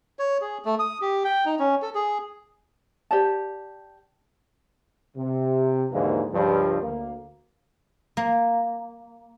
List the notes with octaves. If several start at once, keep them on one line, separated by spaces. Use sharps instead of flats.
C#5
G#4
A3
D#6
G4
G5
D#4
C#4
A4
G#4
G4 C5 D5 A5
C3
D#2 G#2 D3 E3 F3 A#3
C#2 G2 F3
D2 A#3
A#3